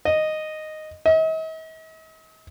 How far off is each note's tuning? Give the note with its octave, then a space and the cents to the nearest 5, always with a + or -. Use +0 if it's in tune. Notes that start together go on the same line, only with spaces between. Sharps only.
D#5 -5
D#5 +45